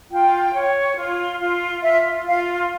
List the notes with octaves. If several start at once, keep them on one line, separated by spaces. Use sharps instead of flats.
F4 G5
C#5
F4
F4
F4 E5
F4 F5